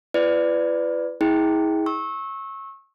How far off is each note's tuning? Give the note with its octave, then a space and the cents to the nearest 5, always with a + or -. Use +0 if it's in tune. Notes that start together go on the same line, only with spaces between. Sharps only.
F4 -45 B4 +20 D5 +0
E4 -40 G#4 +0 G5 +0
C#6 -25 E6 -20